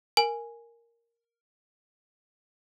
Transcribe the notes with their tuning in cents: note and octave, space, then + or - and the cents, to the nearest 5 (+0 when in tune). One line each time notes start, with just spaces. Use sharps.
A#4 +0 G#5 +0